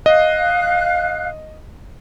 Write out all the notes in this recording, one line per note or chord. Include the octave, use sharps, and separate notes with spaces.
D#5 F5 F#6